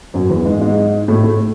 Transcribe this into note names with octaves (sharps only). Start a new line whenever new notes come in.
F#2 F#3
E2 E3
G#2 G#3
G#2 G#3
A2 A3
A2 A3